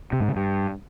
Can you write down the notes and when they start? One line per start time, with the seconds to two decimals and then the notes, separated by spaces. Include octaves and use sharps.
0.13 C3
0.20 G#2
0.28 C#3
0.36 G2